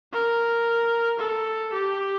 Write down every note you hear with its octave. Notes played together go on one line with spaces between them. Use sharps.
A#4
A4
G4